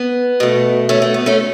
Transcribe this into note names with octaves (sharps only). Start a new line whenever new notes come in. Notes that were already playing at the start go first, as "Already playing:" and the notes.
Already playing: B3
B2 A3
A3 C#4
A3
B3
A3 C#4